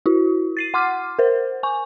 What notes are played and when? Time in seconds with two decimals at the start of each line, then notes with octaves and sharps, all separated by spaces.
0.06 E4 F#4
0.57 A6 C7 D#7
0.74 F#5 C6 D6 F6
1.19 A#4 C5
1.63 G#5 C#6